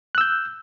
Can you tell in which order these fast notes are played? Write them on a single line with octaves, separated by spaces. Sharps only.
F#6 E6 G6